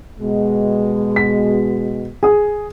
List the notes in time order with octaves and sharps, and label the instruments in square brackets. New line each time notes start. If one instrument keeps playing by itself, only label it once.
[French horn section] B2 G#3
[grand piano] B6
G#4 D#6